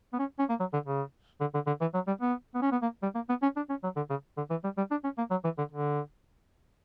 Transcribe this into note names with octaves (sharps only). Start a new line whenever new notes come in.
B3
C#4
C#4
A#3
F#3
D3
C#3
D3
D3
D3
E3
F#3
G3
B3
B3
C#4
B3
A#3
G3
A#3
B3
C#4
D4
C#4
F#3
D3
C#3
D3
E3
G3
G3
D4
C#4
A#3
F#3
E3
D3
D3